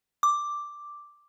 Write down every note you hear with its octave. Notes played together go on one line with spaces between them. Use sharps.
D6